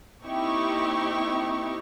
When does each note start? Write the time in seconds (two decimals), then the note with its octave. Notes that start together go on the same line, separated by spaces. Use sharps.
0.23 A#3 C4 D#4 E4 G4 C#6